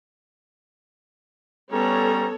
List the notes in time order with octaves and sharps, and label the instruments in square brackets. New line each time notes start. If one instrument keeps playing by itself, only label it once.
[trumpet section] G3 C#4 A#5 [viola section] B3 A4 C#5